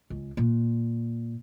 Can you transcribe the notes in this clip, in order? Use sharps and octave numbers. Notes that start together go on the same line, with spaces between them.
C#2
A#2